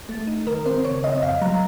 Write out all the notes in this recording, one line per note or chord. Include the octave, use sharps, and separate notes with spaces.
A3
D#4
D#3 A#4
C4 C5
C#3 C#5
C4 D#5
D#5
F2 F5
F#3 A#5